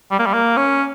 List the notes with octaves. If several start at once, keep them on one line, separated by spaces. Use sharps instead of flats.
G3
A#3
G3
A#3
C#4